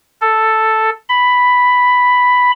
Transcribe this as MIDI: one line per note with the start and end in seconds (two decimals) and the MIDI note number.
0.21 0.90 69
1.09 2.51 83